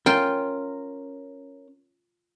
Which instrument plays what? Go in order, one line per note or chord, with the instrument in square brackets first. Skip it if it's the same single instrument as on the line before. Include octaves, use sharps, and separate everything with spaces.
[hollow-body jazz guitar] C#4 A#4 [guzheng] F4 G5